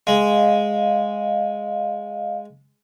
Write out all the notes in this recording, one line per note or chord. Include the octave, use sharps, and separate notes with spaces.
G#3 D#5 F5